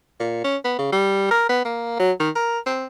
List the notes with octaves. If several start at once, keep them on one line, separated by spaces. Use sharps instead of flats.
A#2
C#4
B3
C#3
G3
A#4
B3
A#3
F#3
D#3
A#4
C4